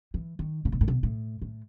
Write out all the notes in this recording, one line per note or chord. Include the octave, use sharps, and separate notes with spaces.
E3
D#3
C#3
B2
A2
B2
A2
A2